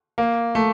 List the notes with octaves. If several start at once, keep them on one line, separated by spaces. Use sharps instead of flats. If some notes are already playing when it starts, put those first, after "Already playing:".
A#3
A3